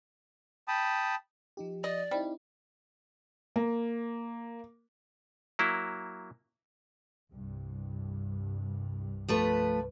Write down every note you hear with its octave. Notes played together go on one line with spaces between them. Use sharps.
G5 A5 B5 D#6
F3 D#4 G4
D5 D#5
G3 C4 D#4 E4
A#3
F#3 A#3 E4
C2 G2
F3 A3 B4